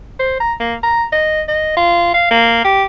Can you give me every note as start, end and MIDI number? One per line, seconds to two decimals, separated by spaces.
0.19 0.37 72
0.40 0.53 82
0.60 0.75 58
0.83 1.04 82
1.12 1.41 75
1.48 1.73 75
1.77 2.09 65
2.14 2.30 77
2.31 2.60 58
2.64 2.84 67